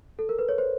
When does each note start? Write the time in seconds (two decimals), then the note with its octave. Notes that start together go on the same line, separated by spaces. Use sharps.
0.19 A4
0.29 A#4
0.39 B4
0.49 C#5
0.58 C5